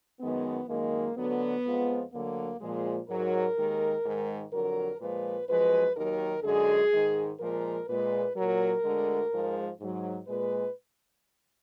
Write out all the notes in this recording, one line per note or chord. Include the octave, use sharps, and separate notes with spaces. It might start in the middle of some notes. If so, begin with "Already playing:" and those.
F#2 D#3 G#3 B3
F#2 D#3 G#3 A#3
D2 D3 F#3 B3
F2 F3 G#3
D2 D3 F#3 A#3
A#2 F3 G#3
G#2 F#3 A#4
D#2 D#3 G#3
G#2 D#3 G#3
F2 D3 F#3 A#4
A#2 F3 G#3 B4
F#2 F3 G#3 B4
D#2 D#3 F#3 A#4
F#2 D3 G#3 G#4
G#2 D#3 G#3
A#2 F3 G#3 A#4
A#2 G#3 B4
A#2 F#3 A#4
D2 D3 G#3
G#2 F3 G#3
G#2 F#3
A#2 G#3 B4